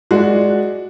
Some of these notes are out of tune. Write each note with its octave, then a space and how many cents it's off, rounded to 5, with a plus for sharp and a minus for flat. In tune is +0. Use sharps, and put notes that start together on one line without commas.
G#3 +10 F#4 +0 D5 +0